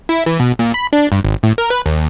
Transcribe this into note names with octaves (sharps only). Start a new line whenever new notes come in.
E4
E3
B2
A#2
B5
D4
G2
G#1
A2
A#4
B4
D#2